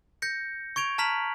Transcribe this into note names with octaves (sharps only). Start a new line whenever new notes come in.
G6 A#6 C#7
C#6 G#6 D7 F7
A5 A#5 F6 B6 F7 F#7